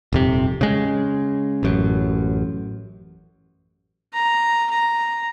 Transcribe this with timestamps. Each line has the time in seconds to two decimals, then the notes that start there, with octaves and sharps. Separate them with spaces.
0.13 D#1 F2 C3
0.61 C#3 G#3
1.63 A1 F#2
4.14 A#5
4.71 A#5